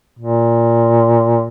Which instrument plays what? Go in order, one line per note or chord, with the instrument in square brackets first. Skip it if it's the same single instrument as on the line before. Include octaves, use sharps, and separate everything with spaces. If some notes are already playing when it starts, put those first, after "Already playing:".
[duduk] A#2